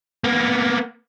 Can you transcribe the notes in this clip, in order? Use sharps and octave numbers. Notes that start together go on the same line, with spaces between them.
A#3 B3